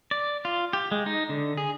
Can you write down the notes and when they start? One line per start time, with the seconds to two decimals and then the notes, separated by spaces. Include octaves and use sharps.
0.11 D5
0.45 F4
0.73 G4
0.91 G#3
1.06 D#4
1.29 D3
1.57 G#4